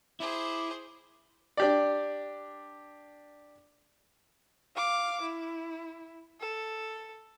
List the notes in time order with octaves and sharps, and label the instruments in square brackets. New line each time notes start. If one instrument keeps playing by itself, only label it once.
[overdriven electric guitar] E4 [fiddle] G#4 C5 [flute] D6
[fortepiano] D4 G4 D5
[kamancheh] F5 D6
E4
A4